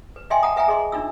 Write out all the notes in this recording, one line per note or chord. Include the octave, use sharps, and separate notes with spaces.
B4
D#5 E5 G5 G#5 C6
F#5 A5 A#5 D#6
B4 E5 F#5 G#5 A#5
G#4 D#5 C6
D4 D#4 F4 E6